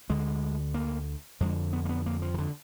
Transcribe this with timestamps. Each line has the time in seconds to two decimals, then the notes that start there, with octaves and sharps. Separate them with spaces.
0.09 D2 D3 G#3
0.74 A#3
1.40 F2 D3 G#3
1.73 B3
1.85 A#3
1.89 B3
2.06 A#3
2.22 F3
2.34 D#3
2.38 D3